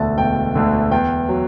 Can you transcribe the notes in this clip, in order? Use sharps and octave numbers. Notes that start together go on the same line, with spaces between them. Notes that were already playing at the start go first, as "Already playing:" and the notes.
Already playing: E1 D2 D3 A3 A5
E1 G5
D2 D3 A3
E2 G5
F#3